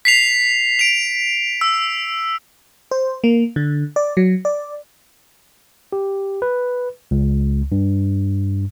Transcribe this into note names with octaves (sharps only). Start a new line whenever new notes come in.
B6 C7 F7
D7 F7
E6
C5
A#3
D3
D5
F#3
D5
G4
B4
C#2
G2